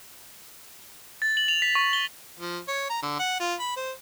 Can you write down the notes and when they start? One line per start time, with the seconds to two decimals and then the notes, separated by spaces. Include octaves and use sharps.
1.22 A6
1.37 F#7
1.48 F7
1.62 B6
1.75 C#6
1.93 G7
2.40 F3
2.68 C#5
2.90 A#5
3.03 D3
3.19 F#5
3.40 F4
3.59 B5
3.76 C5